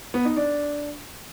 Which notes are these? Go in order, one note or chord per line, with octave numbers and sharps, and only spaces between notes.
B3
D#4
D4